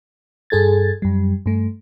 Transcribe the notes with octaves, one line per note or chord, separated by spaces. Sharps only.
G2 G#4 A4 G#6 A6
F#2 G3
G2 A3